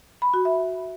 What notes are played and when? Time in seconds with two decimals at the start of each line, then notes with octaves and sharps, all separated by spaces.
0.22 B5
0.34 F#4
0.45 E5